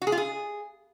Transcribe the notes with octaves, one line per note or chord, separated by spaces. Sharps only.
F#4
G#4
F4
G#4